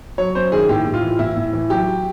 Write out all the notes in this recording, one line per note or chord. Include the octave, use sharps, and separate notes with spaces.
F#3 C#5
F#2 C5
D#3 G#4
A2 G4
A2
F4
E3
A2 E4
A2
E3
F#3 G4